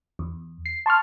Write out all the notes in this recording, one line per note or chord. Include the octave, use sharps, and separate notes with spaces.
E2
C7
A5 C6 C#6 F6